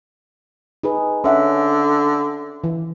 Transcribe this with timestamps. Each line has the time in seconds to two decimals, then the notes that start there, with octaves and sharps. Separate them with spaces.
0.83 D#4 G#4 B4
1.24 D3 C#4 E5 F#5
2.64 E3